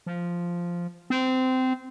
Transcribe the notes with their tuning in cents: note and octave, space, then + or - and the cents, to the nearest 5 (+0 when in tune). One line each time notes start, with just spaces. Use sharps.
F3 -5
C4 -20